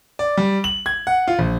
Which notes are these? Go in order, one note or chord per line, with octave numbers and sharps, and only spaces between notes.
D5
G3
F#7
G#6
F#5
F4
A#1